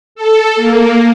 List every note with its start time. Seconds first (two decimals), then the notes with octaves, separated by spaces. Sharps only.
0.15 A4
0.56 A#3